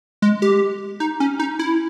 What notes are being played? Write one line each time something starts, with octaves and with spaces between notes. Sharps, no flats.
G#3
G4
D#4
C#4
D#4
E4